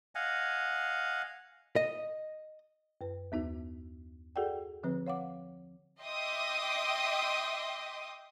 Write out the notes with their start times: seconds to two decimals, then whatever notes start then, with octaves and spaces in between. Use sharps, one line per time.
0.15 D#5 F5 F#5 G#5
1.76 D#5
3.01 F#2 B4
3.32 D#2 B3 D#4 F#4
4.36 F#4 G#4 A4 D5 F#5 G5
4.83 D3 F3 C4 B4
5.07 C#5 F5 F#5 D6
6.00 D#5 E5 G5 C6 D6 D#6